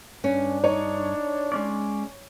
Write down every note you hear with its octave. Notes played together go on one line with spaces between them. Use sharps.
G2 C#4 D4
D#4 C#5
G#3 C#4 D5